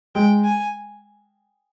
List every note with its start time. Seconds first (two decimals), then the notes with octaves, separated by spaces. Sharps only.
0.15 G#3 G5
0.45 G#5